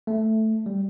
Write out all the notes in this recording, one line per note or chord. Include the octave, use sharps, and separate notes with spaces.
A3
G3